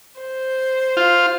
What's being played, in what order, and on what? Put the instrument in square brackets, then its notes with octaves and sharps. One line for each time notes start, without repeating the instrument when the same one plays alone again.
[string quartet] C5
[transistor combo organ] F4